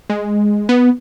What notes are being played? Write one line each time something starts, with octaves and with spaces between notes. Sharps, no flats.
G#3
B3